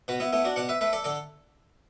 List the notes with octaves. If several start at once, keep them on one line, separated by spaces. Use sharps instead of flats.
B2 F#4 B4
B3 E4
A3 B3 E4
D4 F#4
B2 D5 F#5
B4 E5
A3 B4 E5
A4 D5
D3 A4 D5